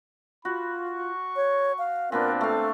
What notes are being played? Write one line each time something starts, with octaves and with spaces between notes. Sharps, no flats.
F4 F#4 B5
C#6
C#5
F5
A#2 B3 C4 D4 A#4
A3 A4 F5